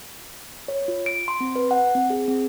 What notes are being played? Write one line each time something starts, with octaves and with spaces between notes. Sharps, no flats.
C#5
F4
D7
C6
C4
B4
F#5
C4
G#4
C4